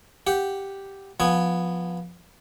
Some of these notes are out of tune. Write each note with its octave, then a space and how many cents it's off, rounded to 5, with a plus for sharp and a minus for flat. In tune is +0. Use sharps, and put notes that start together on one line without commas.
G4 +0 F#5 +0
F3 +15 B3 +0 G#5 +0